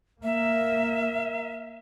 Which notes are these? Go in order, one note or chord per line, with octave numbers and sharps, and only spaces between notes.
A#3 E5